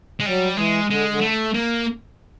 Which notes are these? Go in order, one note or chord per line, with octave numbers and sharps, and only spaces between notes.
G#3
F#3 G3
E3 G#3
D3 G#3
D3
A3
A#3